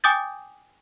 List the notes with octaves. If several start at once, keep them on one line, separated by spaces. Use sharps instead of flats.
G5 G#5 D6 D#6 G6 A6